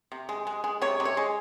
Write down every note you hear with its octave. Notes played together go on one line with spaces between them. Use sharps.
C3
G#3
G#3
G#3
C3 C#5
C3
C#5
G#3